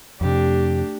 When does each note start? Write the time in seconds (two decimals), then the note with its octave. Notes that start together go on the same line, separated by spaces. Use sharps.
0.21 F2 C3 A3 D4 G4